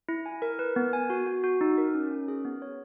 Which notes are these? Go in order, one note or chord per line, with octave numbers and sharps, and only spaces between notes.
E4
G#5
A#4
B4
B3
G#5
F#4
F#4
F#4
D#4
A#4
C#4
C#4
G#4
B3
C#5